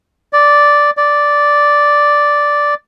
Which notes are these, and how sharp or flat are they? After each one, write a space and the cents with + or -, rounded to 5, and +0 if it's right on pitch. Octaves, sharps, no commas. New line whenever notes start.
D5 -5
D5 -5